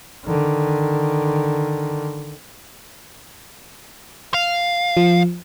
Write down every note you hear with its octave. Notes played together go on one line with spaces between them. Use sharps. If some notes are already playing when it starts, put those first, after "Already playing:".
D3 D#3
F5
F3